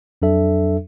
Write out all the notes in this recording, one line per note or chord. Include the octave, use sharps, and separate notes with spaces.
F2 F#3 D4 A4 E5